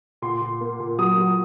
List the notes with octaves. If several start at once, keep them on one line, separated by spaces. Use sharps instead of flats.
A#2 C6
A#2
A#3
A#2
F#3 D#6
F#3